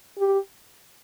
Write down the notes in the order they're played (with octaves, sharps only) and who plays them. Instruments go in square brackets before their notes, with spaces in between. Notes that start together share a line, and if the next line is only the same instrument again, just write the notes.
[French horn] G4